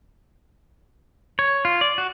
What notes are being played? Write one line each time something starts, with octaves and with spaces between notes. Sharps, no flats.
C#5
F4
D5
F#4